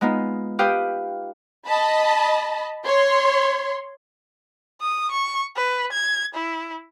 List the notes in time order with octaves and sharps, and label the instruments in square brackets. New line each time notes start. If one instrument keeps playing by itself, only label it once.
[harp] G#3 B3 D#4 F4
G4 B4 F5 G5 D#6
[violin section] D#5 A5 B5
C#5 C6
[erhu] D#6
C#6
B4
G#6
E4